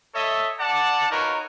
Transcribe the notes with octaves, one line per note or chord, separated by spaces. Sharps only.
A4 C#5 D#5 E5
D5 F#5 A5
D#4 F4 F#4 A#4 B4 C#5